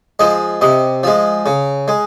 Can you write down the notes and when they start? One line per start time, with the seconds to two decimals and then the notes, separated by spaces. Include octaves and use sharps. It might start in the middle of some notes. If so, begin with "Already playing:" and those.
0.19 F3 G#3 D#5
0.61 C3 D#5
1.03 F3 G#3
1.46 C#3
1.88 G#3